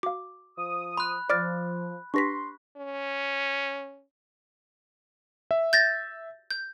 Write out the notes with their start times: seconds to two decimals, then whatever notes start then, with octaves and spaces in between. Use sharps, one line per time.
0.03 F#4 F5 D6
0.58 F3 D#6
0.97 B5 C6 F#6
1.30 F3 D5 D6 F6 A6 D7
2.14 D4 G4 B4 C6 C#6 A#6 B6
2.77 C#4
5.51 E5
5.73 G6 A6 A#6
6.50 G6